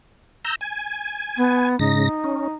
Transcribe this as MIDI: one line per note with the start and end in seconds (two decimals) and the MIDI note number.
0.45 0.55 82
0.45 0.55 88
0.45 0.55 91
0.61 1.69 80
1.37 1.76 59
1.79 2.09 44
1.79 2.09 49
1.79 2.54 63
1.79 2.09 94
2.24 2.48 61